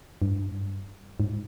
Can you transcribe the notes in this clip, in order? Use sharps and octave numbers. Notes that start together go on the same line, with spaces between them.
G2
G#2